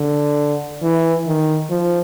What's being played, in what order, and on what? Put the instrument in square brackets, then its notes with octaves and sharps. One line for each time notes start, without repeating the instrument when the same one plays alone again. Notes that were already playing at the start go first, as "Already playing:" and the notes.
Already playing: [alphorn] D3
E3
D#3
F3